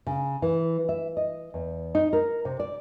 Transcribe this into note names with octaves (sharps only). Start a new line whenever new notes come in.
C#3
E3
E5
D#5
E2
D#4
A#4
C3
D5